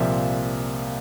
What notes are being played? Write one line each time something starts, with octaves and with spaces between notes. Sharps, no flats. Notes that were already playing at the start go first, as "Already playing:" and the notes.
Already playing: C2 A#2 F3 E5